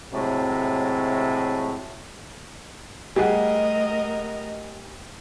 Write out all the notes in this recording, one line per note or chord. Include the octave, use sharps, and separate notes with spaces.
A2 C3 F#3 G#3
G3 A3 G#4 A#4 D#5 F#5